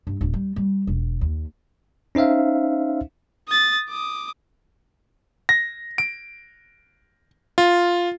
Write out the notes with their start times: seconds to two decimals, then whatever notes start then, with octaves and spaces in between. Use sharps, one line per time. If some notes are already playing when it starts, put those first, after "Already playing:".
0.07 G2
0.21 D1
0.33 G3
0.56 G3
0.87 E1
1.21 D#2
2.15 C#4 D#4 C5 E5 F5
3.48 D#6 A6
3.89 D6 D#6
5.49 A#6
5.98 D7
7.58 F4